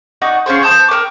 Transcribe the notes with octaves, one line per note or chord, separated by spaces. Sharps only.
D#4 F#4 D5
C#4 F4 G#4 C5
C5 A5 D#6 G6
A#4 B4 G5 D6